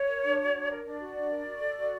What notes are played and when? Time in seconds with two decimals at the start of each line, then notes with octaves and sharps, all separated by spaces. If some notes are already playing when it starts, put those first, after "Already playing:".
Already playing: C#5
0.08 A#4
0.24 D4
0.40 F#4
0.54 D4
0.70 A#4
0.85 D4 D5
1.01 F#4
1.15 D4
1.30 A#4
1.46 F#4
1.61 A4
1.76 F#4